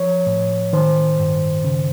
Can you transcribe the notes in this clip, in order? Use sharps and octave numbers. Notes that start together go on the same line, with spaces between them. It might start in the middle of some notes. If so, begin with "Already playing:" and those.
Already playing: F3 C#5
A2
D#3 C5
G2
C#3